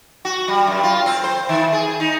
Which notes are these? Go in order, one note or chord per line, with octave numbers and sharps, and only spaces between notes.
F#4
G3
F#2
F4
C4
C5
D#3
G#4
D#4